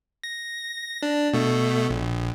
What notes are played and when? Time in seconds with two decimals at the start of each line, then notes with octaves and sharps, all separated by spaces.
0.24 A#6
1.02 D4
1.33 B2 A3
1.90 A#1